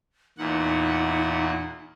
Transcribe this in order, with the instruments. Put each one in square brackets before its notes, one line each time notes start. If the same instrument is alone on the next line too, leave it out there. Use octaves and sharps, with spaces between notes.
[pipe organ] E2 A#2 F#5 [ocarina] D#4